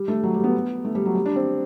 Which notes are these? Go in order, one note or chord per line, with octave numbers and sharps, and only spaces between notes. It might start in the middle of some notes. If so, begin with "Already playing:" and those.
Already playing: G3
A3
F#3
G3
B3
A3
G3
F#3
G3
D4
C4